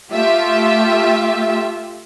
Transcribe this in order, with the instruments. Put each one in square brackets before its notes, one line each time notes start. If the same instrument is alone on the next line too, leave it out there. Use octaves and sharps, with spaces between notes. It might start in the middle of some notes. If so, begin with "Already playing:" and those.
[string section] A3 F4 G4 E5